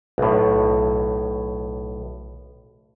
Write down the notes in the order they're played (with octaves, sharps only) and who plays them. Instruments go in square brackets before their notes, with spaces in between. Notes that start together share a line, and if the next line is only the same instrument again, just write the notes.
[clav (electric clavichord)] B1 A2